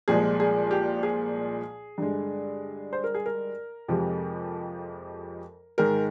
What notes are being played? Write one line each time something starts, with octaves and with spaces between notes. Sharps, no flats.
C2 A#2 F3 G#3 G#4
G#4
G4
G#4
G2 D3 G#3
C5
A#4
G#4
A#4
F2 C3 F3 G#3
G#2 D#3 G#3 A#4